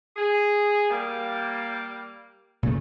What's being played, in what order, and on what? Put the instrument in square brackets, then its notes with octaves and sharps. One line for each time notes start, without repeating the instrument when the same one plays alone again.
[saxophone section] G#4
G3 A#3
[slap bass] A#2 C#3 A3